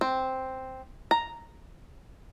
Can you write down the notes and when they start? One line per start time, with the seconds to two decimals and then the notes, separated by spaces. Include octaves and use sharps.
0.01 C4
1.11 A#5